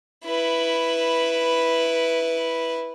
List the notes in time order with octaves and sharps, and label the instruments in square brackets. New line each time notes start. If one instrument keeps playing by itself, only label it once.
[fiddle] E4 B4